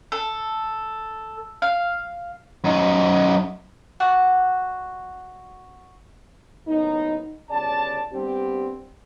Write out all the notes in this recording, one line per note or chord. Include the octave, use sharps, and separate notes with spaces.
A4
F5
F#2 D#4
F#4 D5 F#5
F#1 A2 B3 D#4
G1 C#3 D5 A5
G3 B3 C4 D4 G4